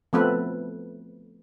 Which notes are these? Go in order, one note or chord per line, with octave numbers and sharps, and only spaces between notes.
F3 A3 B3 C4 A4 B4